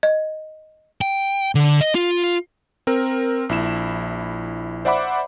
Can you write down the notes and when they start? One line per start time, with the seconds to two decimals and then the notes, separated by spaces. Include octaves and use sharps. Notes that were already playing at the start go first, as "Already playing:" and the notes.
0.03 D#5
1.01 G5
1.55 D3
1.81 D#5
1.95 F4
2.87 C4 A#4
3.49 A#1 E4 E7
4.85 C5 D5 E5 F#5 B5 D6